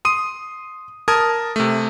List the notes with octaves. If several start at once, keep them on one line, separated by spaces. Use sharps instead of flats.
C6 D#6 D#7
A#4 A5 D#6 G#6
C3 A3